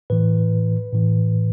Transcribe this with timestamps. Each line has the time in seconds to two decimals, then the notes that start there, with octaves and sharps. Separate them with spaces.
0.10 A2 E3 B4
0.92 A2 E3